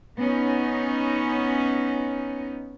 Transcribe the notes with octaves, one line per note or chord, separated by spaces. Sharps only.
B3 C#4 D#4